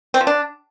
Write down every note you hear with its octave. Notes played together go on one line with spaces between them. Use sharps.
C4
F3
D4